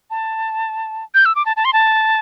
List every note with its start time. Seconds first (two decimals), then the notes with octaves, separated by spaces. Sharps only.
0.10 A5
1.14 G6
1.25 E6
1.35 D6
1.46 A5
1.56 A5
1.65 C6
1.73 A5